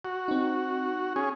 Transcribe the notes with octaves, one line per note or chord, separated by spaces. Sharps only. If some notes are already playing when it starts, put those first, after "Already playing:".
F#4
C4 D#4
C#4 G#4